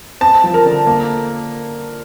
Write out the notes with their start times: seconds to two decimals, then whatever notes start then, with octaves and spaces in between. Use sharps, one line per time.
0.21 C4 A5
0.44 F3
0.54 A#4
0.65 D3
0.86 A#3